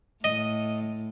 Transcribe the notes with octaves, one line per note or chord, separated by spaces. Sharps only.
A2 D#5